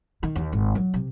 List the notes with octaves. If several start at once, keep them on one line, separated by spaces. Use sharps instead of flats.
D#3
D#2
G#1
F#3
C3